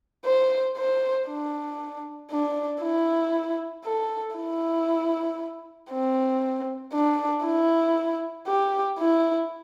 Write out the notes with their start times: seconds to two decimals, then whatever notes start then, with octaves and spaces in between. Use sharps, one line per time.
0.25 C5
0.77 C5
1.28 D4
2.31 D4
2.82 E4
3.85 A4
4.36 E4
5.91 C4
6.94 D4
7.45 E4
8.47 G4
8.99 E4